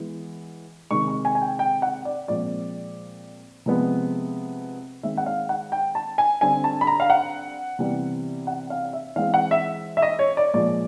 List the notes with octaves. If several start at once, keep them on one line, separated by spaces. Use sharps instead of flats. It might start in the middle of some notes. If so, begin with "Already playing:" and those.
Already playing: E3 G#3 B3
C3 D#3 G#3 C#6
C#6
G#5
G#5
G5
G5
F#5
D5
A#2 F3 G#3 C4 D5
C3 F3 G#3 B3
D#3 G#3 C4 E5
F#5
F5
F#5
G5
A5
G#5
D3 G3 C4 G#5
A5
B5
A#5
F5
F#5
C3 E3 G3 B3
F#5
F5
E5
E3 G#3 C4 F5
F#5
E5
E5
D#5
C#5
D5
A#2 F3 G#3 D5